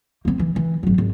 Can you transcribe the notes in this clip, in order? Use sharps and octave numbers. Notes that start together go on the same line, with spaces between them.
A#3 C4
E3
E3
G#1 F#3
G#1